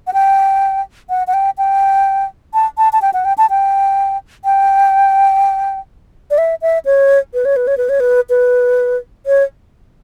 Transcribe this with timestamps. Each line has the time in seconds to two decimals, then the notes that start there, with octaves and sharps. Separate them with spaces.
0.07 F#5
0.13 G5
1.10 F#5
1.27 F#5
1.34 G5
1.58 G5
2.54 A5
2.78 A5
2.93 A5
3.02 G5
3.14 F#5
3.25 G5
3.38 A5
3.50 G5
4.45 G5
6.31 D5
6.38 E5
6.62 E5
6.85 C#5
7.34 B4
7.45 C#5
7.56 B4
7.67 C#5
7.77 B4
7.89 C#5
8.00 B4
8.30 B4
9.26 C#5